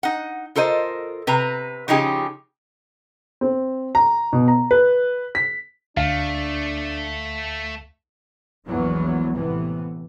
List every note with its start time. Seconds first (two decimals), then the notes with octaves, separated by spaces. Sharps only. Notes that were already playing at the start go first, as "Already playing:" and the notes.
0.03 D#4 F#5
0.56 F4 A4 A#4 C5 D#5
1.27 C3 B4 A#5
1.88 C#3 F3 C#4 D#4 G4 G#4
3.41 C4
3.95 A#5
4.33 B2
4.48 A#5
4.71 B4
5.35 B6
5.97 D2 A3 D4 F5
8.66 A#1 E2 E3 F#3 G#3 B3
9.35 A2 C3 E3 B3